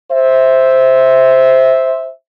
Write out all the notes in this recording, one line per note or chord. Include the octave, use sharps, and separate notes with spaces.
C5 E5